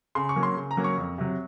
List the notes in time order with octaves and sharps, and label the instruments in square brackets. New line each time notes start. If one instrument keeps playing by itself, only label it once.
[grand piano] C#3 C6
C#6
F#3 A#3 C#4
C6
C#3
A#5
F#3 A#3 C#4
C#6
F2
C3 F#3